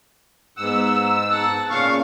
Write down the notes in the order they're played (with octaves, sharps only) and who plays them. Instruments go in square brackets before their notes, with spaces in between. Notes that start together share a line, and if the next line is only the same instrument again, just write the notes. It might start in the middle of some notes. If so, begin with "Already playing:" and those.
[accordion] G#2 E6 [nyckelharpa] B3 F#5
[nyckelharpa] F#5 A5
[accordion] A#2 C#3 C#6 [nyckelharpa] F5